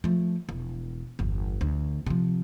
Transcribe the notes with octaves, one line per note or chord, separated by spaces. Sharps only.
F3 A3
E1
G1 E2
D2
C3 F3